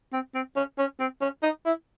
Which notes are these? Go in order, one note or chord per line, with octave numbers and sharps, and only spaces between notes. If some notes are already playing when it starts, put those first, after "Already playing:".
C4
C4
C#4
C#4
C4
C#4
D#4
E4